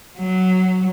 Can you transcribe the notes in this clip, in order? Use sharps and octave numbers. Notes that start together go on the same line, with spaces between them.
F#3